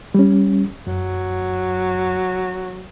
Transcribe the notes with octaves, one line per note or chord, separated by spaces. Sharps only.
G3 C#4
F#2 F#3